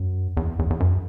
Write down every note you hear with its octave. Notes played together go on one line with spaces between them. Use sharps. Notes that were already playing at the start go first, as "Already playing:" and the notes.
Already playing: F#2
E2
E2
E2
F#2